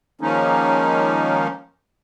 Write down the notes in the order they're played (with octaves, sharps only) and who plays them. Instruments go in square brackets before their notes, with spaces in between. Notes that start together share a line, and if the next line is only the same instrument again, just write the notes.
[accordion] D#3 F3 G#3 A#3 C#4 D#4